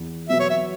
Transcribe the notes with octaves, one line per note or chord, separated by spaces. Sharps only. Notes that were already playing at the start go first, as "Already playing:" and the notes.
Already playing: E2
B2 F#3 B3 F#4 E5
C#5
E5